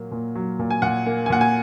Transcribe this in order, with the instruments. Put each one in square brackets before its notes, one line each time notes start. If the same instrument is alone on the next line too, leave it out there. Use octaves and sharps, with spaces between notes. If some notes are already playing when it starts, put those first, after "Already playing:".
Already playing: [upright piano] A#2 F#3 A#3
A#2
F#3
A#2
G#5
A#2 F#5
A#3
G#5
A#2 F#5
G#5